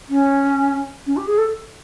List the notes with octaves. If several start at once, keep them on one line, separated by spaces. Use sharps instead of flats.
C#4
C#4
G4
G#4
A4